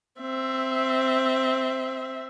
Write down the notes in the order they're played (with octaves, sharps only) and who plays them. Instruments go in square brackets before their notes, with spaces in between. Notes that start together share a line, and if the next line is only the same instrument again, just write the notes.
[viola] C4 E5